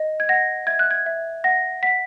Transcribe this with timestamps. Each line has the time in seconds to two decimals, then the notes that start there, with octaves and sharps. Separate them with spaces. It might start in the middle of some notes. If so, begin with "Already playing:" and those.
Already playing: D#5
0.20 G#6
0.29 F#5 A#6
0.67 E5 G#6
0.79 F#6
0.91 G#6
1.06 E5
1.44 F#5 A#6
1.83 F#5 B6